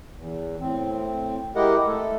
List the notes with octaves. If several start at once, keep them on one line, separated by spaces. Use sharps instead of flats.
E2
A2 C4
G#3 E4 G4 A#4 D#5 F#5
A3 A4